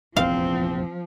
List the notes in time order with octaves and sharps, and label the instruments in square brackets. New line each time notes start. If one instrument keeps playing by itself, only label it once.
[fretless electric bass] F1 A#1 E2 [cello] F3 [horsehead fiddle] C4 [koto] F5